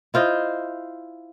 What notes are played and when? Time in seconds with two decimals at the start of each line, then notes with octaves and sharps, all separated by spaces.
0.14 E4 F4 C5 D#5